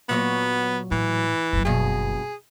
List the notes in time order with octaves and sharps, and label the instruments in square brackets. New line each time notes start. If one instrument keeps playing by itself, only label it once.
[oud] A#2 F#3 C#5 [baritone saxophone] B3
[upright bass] A2 [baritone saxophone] E3
[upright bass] F#1 F#3
[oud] G2 B2 [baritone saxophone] G#4